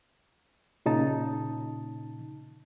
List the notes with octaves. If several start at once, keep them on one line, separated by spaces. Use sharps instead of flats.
A#2 C#3 D#4 A5